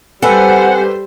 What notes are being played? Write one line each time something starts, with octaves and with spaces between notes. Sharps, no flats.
G3 C4 G4 A4 B4 C5 F#5 G#5